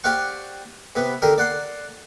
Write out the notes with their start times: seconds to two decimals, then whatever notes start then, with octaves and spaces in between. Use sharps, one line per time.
0.04 G4 C5 D5 F5 F#5 C#6
0.95 C3 B3
1.22 D3 G4 A#4
1.38 D5 F#5 C6